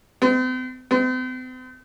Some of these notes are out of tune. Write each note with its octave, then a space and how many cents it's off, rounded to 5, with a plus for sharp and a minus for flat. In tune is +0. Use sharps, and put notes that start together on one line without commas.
C4 -45
C4 -45